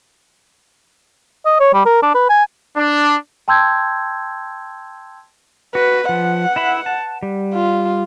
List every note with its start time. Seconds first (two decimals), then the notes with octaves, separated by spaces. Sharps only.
1.46 D#5
1.60 C#5
1.74 G3
1.86 A#4
2.03 D4
2.15 B4
2.30 G#5
2.76 D4
3.48 G5 A5 C6 E6 G6 G#6
5.75 F#4 B4
6.09 F3 F#5
6.56 E4 E5 B5
6.86 A5
7.23 G3
7.54 F4